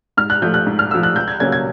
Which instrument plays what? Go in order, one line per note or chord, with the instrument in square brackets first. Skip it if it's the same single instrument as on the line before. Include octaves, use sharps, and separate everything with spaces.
[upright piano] G#2 F6
F#6
F3 A3 G6
F#6
G#2
F6
F3 A3 E6
F#6
C#2 G6
G#6
C#3 F#3 A#3 C#4 G#6
G#6